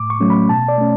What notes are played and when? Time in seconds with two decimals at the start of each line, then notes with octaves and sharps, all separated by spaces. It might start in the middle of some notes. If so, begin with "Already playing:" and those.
Already playing: A2 D6
0.10 C#6
0.20 F#3 A3 C#4
0.30 B5
0.49 B2 A5
0.68 D5
0.78 A3 C#4